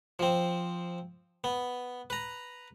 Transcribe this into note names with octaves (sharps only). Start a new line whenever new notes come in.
F3 C4
B3
B4 A#5